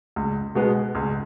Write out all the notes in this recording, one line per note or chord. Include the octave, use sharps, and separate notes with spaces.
C#2
B2 G#3 B3
C#2